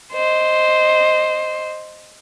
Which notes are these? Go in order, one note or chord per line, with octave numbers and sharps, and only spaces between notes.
C5 D#5